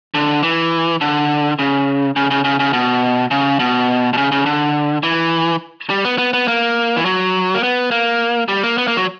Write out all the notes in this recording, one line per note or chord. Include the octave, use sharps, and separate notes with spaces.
D3
E3
D3
C#3
C#3
C#3
C#3
C#3
B2
C#3
B2
B2
C#3
C#3
D3
E3
G3
B3
B3
B3
A#3
E3
F#3
A#3
B3
A#3
G3
A#3
B3
A#3
F#3